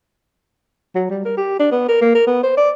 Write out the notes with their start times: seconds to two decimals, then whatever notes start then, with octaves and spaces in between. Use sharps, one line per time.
0.95 F#3
1.10 G3
1.25 A#4
1.37 G4
1.60 D4
1.72 B3
1.88 A#4
2.01 A#3
2.15 A#4
2.27 B3
2.43 C5
2.57 D5